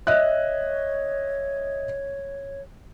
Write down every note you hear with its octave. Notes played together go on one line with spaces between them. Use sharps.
C#5 D#5 E5 F#6